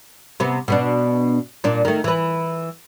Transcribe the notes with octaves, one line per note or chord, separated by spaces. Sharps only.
C3 B3
B2 B3 D4
A#2 D4
D#3 A3
E3 B4